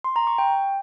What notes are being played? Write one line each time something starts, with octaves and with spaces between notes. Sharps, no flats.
C6
A#5
C#6
G5